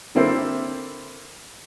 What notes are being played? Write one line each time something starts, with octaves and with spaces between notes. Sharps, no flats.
D3 A#3 C4 E4 A4 C5